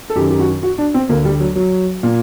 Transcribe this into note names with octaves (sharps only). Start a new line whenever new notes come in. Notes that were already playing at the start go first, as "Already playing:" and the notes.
A4
F#2 D#3 G4
G4
F#4
F#4
D4
C4
D2 D3 A#3
G3
F#3
F#3
A#2